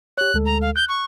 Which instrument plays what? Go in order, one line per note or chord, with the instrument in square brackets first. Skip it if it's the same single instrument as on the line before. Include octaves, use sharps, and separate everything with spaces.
[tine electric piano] G4 C#5 [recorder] F#6
[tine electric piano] D2 G#3 A4
[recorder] A#5
F5
[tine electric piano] F#6 [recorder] G6
[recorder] C#6